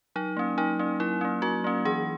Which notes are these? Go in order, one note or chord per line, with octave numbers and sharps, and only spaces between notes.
F#3 D#4
A#3 C#4
F#3 D#4
A#3 C#4
F#3 E4
A#3 C#4
F#3 F#4
A#3 C#4
E3 G#4